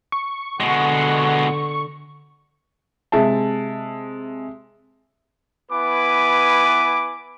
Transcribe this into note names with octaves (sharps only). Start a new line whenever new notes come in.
C#6
B2 D3 G#3 F#5
C3 G#3 E5 A5
B3 E4 B4 G#5 D6